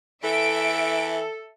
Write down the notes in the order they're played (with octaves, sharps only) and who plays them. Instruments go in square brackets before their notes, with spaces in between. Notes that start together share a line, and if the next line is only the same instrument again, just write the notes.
[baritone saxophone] E3 [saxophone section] A4 [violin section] E5 D7